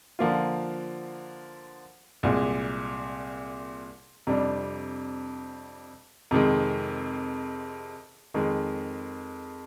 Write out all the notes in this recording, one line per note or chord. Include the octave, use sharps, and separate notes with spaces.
D3 F3 A#3 F4
C2 A#2 G#3
F2 C3 G3 D4
F2 C3 D#3 G#3
F2 D#3 G#3